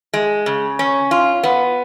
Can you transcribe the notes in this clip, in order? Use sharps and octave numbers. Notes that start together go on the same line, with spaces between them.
G#3
C#3
C#4
F4
B3